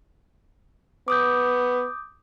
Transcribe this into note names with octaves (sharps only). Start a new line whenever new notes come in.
B3 D6 D#6 G6